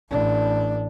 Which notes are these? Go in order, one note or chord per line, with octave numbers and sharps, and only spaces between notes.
A1 D4